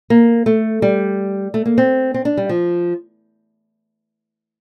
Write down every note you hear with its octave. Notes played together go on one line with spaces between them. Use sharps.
A#3
A3
G3
A3
A#3
C4
C4
D4
G3
F3